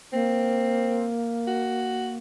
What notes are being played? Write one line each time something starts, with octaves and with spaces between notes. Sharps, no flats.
A#3 C4
F#4